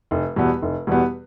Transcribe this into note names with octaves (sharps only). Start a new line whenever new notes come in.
F1
E2 B2 G3 B3
F1
E2 B2 G3 B3